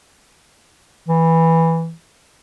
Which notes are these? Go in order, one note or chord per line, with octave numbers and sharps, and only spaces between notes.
E3